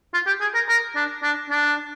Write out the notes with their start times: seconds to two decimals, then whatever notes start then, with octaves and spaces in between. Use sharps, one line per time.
0.14 F4
0.27 G4
0.41 G#4
0.55 A#4
0.69 A#4
0.96 D4
1.23 D4
1.50 D4